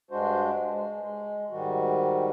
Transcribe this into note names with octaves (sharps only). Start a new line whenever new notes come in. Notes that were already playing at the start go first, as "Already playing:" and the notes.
G2 G#3 D4 F#4 C5
G#3
G#3
G#2 D#3 G3 F#4